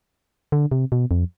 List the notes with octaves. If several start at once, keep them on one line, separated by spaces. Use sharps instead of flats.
D3
C3
B2
F2